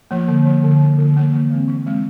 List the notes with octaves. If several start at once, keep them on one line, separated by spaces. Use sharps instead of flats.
F3 A#3
D3
F3 A#3
D3
F3 A#3
D3
F3 A#3
E3
G#3 C4
E3
G#3 C4